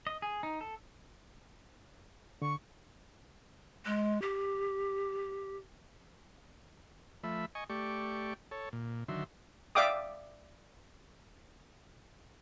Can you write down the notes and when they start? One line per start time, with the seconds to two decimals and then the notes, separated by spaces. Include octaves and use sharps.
0.07 D#5
0.22 G#4
0.43 D#4
0.61 A4
2.42 D3 C#6
3.86 G#3
4.22 G4
7.24 F3 A3 E5 B5
7.55 D#5 G#5 C#6
7.70 A3 G4 D5 C#6
8.51 A4 C#5
8.73 A#2
9.08 D3 D#3 F#3 E5 C6
9.75 D5 E5 F5 G5 D6 D#6